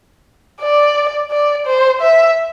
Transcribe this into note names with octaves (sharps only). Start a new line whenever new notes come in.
D5
D5
C5
E5